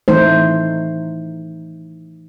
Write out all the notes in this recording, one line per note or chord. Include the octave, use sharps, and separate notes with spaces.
E3 A3 D#4 C5